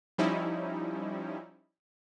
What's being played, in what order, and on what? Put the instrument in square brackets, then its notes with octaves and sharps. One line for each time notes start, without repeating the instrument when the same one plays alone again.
[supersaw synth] F3 G3 C#4 D#4 E4